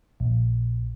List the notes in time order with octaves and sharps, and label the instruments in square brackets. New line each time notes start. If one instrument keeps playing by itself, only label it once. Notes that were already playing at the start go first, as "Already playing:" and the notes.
[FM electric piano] A#1